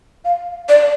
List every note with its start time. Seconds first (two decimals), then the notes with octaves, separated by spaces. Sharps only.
0.25 F5
0.69 D5